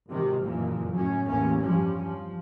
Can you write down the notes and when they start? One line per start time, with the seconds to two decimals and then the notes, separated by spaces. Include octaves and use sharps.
0.10 G#1 C3 D#3
0.43 F#1 F2 A#2 E3 F3
0.91 F#2 A2 F#3 C#4
1.26 A1 E2 A#3 C#4
1.61 E2 G2 F3 G3 C#4
2.01 F3